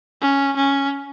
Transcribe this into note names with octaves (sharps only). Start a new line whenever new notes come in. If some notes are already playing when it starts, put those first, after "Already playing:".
C#4
C#4